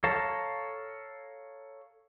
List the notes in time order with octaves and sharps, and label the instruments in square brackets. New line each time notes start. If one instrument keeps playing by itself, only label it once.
[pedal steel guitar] A4 C#5 F5 A5 A#5